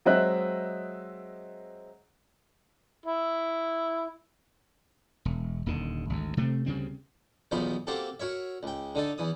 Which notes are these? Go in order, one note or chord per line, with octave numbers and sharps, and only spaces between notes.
F#3 G#3 C4 D#5 E5 F#6
E4
E1
D#1 D#2 D3
G#1 D2
C3 A3 C4
D2 C#3 G3 C4
B1 E2 F3 D#4 C5 B5
A#3 C4 F#4 G4 A4
F#4 A#4 C#5 E5
C#2 G5
D3 D#4 A4
E2 E3 D#6